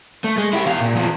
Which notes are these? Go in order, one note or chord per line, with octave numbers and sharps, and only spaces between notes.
A3
G#3
E4 G4
E2 F5
A#2
E2 F3